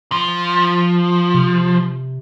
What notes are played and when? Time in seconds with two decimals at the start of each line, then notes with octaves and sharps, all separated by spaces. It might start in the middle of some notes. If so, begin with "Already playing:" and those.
0.12 F3
1.34 C3